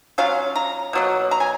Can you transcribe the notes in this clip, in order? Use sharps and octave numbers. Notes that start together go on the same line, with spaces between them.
F#3 C#4 F4 F5
A#5
B2 F#3 A#3
A#5
G#5